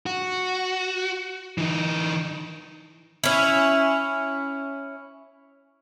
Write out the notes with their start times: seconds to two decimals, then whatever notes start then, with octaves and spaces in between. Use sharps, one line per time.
0.06 F#4
1.58 E3 D#4
3.24 C#4 E4